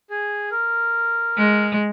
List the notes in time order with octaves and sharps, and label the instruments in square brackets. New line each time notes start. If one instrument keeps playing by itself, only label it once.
[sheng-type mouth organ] G#4
A#4
[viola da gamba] G#3